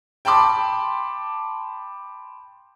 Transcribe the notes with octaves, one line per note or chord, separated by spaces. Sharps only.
G5 A5 B5 C6 D6